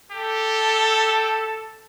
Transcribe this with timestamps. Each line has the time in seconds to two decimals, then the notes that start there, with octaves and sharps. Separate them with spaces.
0.11 G4 A4